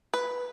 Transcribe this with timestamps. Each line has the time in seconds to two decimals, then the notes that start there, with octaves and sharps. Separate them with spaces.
0.14 B4